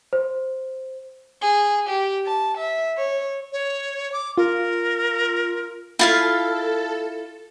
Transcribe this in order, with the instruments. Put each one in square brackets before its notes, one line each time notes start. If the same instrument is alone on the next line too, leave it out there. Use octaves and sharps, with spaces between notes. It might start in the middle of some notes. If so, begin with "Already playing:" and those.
[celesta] C5
[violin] G#4
G4
A5
E5
C#5
[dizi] C#5
D6
[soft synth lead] F4 [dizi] A#4
[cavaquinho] E4 F4 F5 [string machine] A4 A6